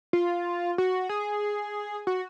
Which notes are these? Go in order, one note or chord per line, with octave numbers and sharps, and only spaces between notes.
F4
F#4
G#4
F#4